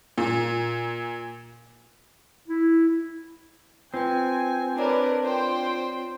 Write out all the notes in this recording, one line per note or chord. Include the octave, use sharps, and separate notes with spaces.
A#2
E4
C4 F4 B4 G5 G#5
D4 A#4 B4 C#5 D5 A#5
F4 C5 G5